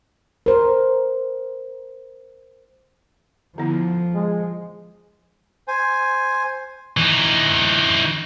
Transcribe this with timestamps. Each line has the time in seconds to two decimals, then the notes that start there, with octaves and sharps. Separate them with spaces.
0.46 A#4 C5
3.58 D3 F3 B3 E4
4.14 G#3
5.68 C5 G#5
6.97 E3 D#4